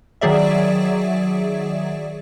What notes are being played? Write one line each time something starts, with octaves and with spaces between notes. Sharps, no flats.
D#3 F#3 G#4 D5 E5